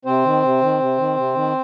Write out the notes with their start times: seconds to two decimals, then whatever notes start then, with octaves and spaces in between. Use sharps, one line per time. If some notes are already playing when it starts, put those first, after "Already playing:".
0.05 C3 C4 C5
0.24 D#3
0.42 C3
0.61 D#3
0.79 C3
0.98 D#3
1.16 C3
1.35 D#3